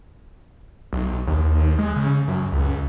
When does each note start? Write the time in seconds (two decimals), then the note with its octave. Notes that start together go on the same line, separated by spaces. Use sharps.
0.93 B1
1.27 D#2
1.79 G#3
1.96 C#3
2.28 F#2
2.52 C#2